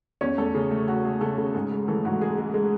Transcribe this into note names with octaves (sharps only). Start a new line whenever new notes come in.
E2 C#4 C#5
E2 A3 A4
C#3 G#4
A3
A3 F#4
A3 G#4
C#3 A3 A4
C#3
G#2 G#4
G#3
E3 A3 A4
G#2 F#4
G#3 G#4
G#3
G#3